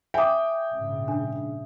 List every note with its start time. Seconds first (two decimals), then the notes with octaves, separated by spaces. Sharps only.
0.14 E5 G5 G#5 D6 D#6
0.72 A#1 G#2 C#3
1.08 D4